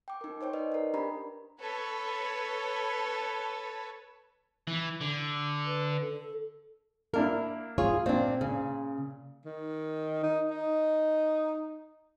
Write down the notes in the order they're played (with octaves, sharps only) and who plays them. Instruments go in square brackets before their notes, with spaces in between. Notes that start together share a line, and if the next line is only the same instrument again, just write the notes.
[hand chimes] G5 D6
D#4 A#4
D#4 C5 C#5 G5
B4 C5 D5 D#5
A#4 D5
D4 G4 A#4 A#5 B5
[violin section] A4 B4 C#5
[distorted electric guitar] E3
D3
[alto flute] B4
A4
[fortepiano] A#3 D4 E4 [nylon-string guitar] A#4
[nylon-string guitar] F4 G#4 C#5
[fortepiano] A#2 [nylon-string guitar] C4 D4
[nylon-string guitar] C#3
[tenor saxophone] D#3
D#4
D#4